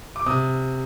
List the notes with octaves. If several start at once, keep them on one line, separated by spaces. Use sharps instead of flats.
D6
C3 D#6